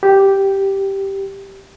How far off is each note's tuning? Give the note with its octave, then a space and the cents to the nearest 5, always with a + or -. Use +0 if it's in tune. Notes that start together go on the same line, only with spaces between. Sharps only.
G4 -5